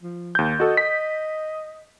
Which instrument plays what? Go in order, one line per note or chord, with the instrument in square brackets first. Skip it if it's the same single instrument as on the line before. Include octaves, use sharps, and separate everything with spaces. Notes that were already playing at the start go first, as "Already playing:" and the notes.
[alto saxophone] F3
[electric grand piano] D#2 G6
[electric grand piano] F#4 A4 [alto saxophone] D#5
[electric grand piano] B6